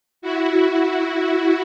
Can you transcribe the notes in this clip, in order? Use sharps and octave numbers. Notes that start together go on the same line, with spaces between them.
E4 F#4